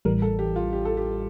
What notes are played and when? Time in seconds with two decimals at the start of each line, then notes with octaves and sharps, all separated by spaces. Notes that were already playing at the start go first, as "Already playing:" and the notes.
0.05 A1 A2 E3 G3 A#4
0.22 A4
0.39 G4
0.56 F4
0.73 G4
0.85 A4
0.97 G4